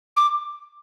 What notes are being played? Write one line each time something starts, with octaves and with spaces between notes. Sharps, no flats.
D6